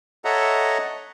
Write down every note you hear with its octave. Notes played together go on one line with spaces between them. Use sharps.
A4 C#5 D#5 E5 F#5 A#5